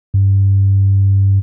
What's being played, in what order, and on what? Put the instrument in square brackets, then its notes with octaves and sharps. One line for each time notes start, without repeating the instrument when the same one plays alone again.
[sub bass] G2